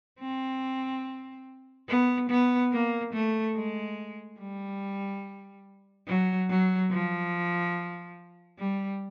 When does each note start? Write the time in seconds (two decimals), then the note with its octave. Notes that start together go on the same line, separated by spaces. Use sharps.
0.20 C4
1.89 B3
2.30 B3
2.72 A#3
3.14 A3
3.55 G#3
4.39 G3
6.07 F#3
6.49 F#3
6.91 F3
8.58 G3